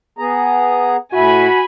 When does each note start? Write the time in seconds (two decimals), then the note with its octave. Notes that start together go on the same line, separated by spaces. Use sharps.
0.18 B3 G#4 A#5
1.13 A2 E4 F#4 G#5 B5